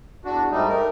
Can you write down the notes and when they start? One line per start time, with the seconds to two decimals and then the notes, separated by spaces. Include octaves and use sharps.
0.25 E2 D4 F#4
0.51 G#2 G3 A3 D#4
0.69 A3 A#4